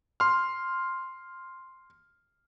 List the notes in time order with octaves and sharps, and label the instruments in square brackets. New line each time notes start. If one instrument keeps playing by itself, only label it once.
[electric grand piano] C6 F6